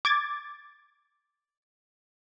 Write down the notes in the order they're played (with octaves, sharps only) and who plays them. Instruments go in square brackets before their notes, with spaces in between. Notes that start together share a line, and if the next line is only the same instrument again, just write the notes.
[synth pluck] D6 G#6 A6